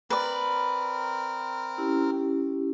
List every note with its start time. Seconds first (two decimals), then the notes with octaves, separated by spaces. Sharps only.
0.10 C4 A#4 B4 D5
1.78 C#4 E4 G4